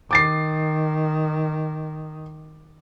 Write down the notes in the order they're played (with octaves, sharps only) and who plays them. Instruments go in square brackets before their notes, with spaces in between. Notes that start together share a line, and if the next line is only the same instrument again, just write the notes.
[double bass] D#3 [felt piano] D6 A6 C7